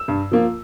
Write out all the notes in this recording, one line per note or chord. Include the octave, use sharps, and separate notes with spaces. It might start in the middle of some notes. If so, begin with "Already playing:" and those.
Already playing: E6
G2
F3 A#3 F4